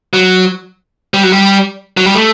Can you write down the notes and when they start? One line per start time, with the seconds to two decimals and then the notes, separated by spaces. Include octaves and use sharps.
0.13 F#3
1.14 G3
1.23 F#3
1.32 G3
1.97 F#3
2.06 G3
2.15 A3